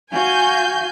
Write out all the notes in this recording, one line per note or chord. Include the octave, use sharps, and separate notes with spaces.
F#4 F5 G#5 G6